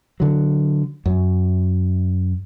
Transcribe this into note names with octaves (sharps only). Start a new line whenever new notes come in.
D3 F#3
F#2